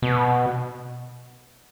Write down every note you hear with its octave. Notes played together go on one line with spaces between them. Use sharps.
B2